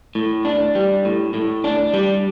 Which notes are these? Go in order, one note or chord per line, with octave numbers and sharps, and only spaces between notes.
A2
D4
G3
A2
A2
D4
G3